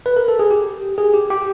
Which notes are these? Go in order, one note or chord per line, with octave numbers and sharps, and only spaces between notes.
B4
A#4
A4
G#4
G4
G#4
G4
G4